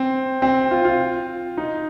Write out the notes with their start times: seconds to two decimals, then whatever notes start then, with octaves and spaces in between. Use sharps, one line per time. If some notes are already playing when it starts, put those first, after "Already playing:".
Already playing: C4
0.42 C4
0.71 F4
0.85 F4
1.57 D#4